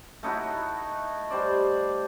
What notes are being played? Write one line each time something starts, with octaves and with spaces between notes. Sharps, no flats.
A3 D#4 E4 F#4
G3 C5 D5